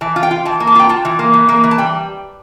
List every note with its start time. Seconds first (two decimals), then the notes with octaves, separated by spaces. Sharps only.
0.01 E3 A5
0.16 F4
0.23 G5
0.31 F4
0.45 E3 A5
0.60 A#3
0.67 A5
0.75 F4 G5
0.89 F4 A5
1.05 E3
1.19 A#3
1.34 E3
1.49 A#3
1.63 E3
1.71 A5
1.78 G3 G5